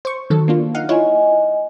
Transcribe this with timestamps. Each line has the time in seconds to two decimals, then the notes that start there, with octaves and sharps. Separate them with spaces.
0.05 C5 C#6
0.30 D#3 F#3 A4
0.48 A#3 D4 F4
0.75 D#4 F5 F#5
0.89 E4 F4 C#5 D#5 E5 G#5